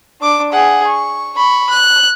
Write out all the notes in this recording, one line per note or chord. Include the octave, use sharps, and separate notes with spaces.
D4 D6
G#4 F#5
C#6
B5 C#6
F#6